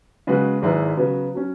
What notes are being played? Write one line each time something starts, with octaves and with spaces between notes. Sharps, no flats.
C#3 G#3 B3 F#4 B4
G#1 G#2 G#3 E4 B4
C#3 F#3 B3
F#3 C#4